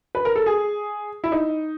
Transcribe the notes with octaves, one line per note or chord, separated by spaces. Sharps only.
B4
A#4
A4
G#4
E4
D#4